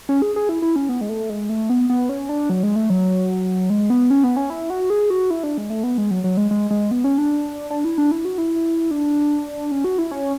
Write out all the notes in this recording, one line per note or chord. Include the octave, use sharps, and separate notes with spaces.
C#4
G#4
G#4
E4
E4
C#4
B3
G#3
A3
G#3
A3
B3
B3
C#4
D4
F#3
G#3
A3
F#3
G#3
B3
C#4
B3
C#4
E4
F#4
G#4
F#4
E4
D4
G#3
A3
B3
G#3
F#3
F#3
G#3
G#3
G#3
B3
C#4
D4
D4
E4
D4
E4
F#4
E4
D4
C#4
F#4
E4
C#4